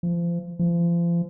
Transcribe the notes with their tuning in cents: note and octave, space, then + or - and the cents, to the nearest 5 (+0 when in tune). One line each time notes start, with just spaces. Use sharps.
F3 -30
F3 -35